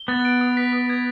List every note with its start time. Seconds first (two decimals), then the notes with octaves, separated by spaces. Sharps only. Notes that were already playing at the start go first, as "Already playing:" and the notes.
Already playing: G7
0.08 B3 A6
0.25 D7
0.41 D#6
0.57 B6
0.73 D#6
0.90 G#6